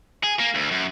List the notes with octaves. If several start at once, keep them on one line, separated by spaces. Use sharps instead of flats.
G#4
A#3
D2
F#2